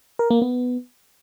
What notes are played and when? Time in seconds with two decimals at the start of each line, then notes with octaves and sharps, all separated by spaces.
0.19 A#4
0.31 A#3
0.42 B3